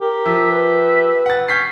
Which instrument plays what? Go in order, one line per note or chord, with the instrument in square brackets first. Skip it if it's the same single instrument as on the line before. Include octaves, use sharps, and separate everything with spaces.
[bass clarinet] G4 [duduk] A#4
[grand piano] F3 [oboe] E5
[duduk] B4
[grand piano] F#5 A6
[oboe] C#4 [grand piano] G6 B6 C7